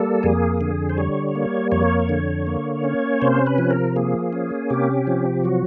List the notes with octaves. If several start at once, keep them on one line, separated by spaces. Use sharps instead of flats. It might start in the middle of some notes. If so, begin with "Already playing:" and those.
Already playing: G3 A#3 A4
F2 G#4
D3
C5
G3 C#5
A#3
F2 C#5
D3
A#3
C#4
C3 C5
B4
F3
A#4
A#3 G#4
C#4
C3 G4
F3
F#3 F#4